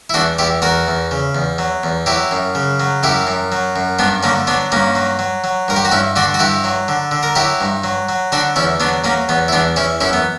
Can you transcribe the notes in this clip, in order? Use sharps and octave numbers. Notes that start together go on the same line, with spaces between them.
E4
E2 D4 F#4
E2 E4 G4
E2 F#4 A#4
E2
C#3
E2
F#3
E2
F#3 E4 G4
F#2
C#3
F#3
F#2 E4 G4
F#2
F#3
F#2
G2 B3 D4
D3 A#3 C#4
F#3 B3 D4
G2 A#3 C#4
F#3
F#3
F#3
G2 A#4
G4
F#4
G2 C#4 E4
D3 D4 F#4
F#4
G2 E4 G4
F#3
D3
D3
A#4
F#3 E4 G4
G2
F#3
F#3
D3 D4 F#4
E2 C#4 E4
F#3 B3 D4
F#3 A#3 C#4
E2 B3
E4
E2 B3 D4
E3 C#4 E4
F#2 C#4 E4
B3